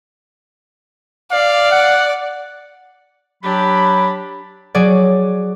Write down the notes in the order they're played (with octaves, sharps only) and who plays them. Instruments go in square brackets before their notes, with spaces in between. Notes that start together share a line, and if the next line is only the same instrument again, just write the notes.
[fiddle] D5 [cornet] F5
[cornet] F#5
[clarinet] F#3 [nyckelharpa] D4 G4 [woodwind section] B5
[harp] F#3 F#4 G#4 D5